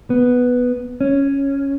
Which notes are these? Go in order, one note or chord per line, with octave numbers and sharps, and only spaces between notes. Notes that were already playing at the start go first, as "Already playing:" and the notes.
B3
C#4